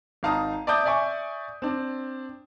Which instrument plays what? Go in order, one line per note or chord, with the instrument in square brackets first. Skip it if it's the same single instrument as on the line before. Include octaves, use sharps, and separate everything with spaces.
[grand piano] G#1 D#4 F5 A5 A#5 D#6
D5 E5 A5 D6 D#6 G6
D5 E5 G#5 C#6 D6
C4 D4